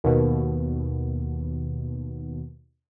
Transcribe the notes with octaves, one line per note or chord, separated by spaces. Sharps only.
D#2 B2